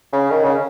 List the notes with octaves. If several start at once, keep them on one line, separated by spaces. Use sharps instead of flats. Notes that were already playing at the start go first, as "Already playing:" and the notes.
C#3
D#3
C#3